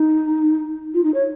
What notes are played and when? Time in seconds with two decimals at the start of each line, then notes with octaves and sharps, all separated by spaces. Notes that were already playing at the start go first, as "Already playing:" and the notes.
Already playing: D#4
0.94 F4
1.04 D#4
1.14 C#5